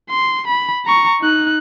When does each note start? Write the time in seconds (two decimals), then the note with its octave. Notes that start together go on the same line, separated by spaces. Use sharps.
0.10 C6
0.48 B5
0.86 A#5 C#6
1.21 D#4 F#6